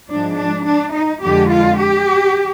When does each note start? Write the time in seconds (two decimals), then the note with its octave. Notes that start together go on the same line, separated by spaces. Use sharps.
0.09 G#2 F3 G#3 D4
0.37 D4
0.66 D4
0.94 D#4
1.23 F2 D3 G#3 G4
1.51 F4
1.80 G4